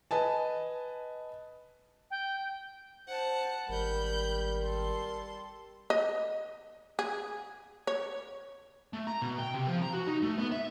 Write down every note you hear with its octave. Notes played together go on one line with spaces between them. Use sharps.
B4 D#5 G#5 A5
G5
C5 F#5 A5
G#1 G3 A#4 B5 G6
A4 C6
D#5
G#4
C#5
A3
A#5
B2
G5
C3
F3
A#5
F#4
D#4
A3
B3
E5